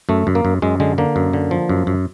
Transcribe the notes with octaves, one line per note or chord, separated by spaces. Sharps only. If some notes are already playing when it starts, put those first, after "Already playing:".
F#2 A3
F#2
A#3
F#2
F#2 G#3
D3 G#3
D3 A#3
F#2
D3
F3
F#2
F#2